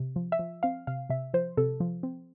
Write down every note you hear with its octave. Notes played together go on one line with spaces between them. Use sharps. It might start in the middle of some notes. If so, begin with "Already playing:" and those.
Already playing: C3
F3
E5
F3
C4 F5
C3 F5
C3 E5
F3 C5
C3 A4
F3
C4